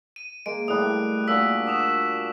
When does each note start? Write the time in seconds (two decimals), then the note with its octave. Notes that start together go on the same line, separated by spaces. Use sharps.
0.16 D#7
0.46 G#3 A#3 D7
0.68 A2 G3 D#6 F#6
1.28 A#2 D4 F#4 E6 B6
1.67 F#4 D6 D#6 E7